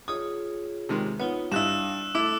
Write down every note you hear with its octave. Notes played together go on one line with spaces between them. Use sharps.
F4 G#4 C#5 D#6
C3 D#3 G#3
B3 D#4 F4 C#5
G2 D4 E4 F5 D#6 E6 F#6 E7
A3 E4 A4 D6 E6